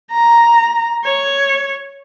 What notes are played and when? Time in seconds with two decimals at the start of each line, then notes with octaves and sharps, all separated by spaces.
0.12 A#5
1.05 C#5